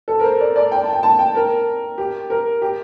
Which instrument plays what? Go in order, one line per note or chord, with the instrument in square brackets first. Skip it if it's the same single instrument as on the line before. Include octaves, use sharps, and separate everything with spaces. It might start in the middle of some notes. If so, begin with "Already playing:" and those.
[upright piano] A4
A#4
C5
D5
D5
G5
A5
G5
A5
G5
A#4
G4
A#4
G4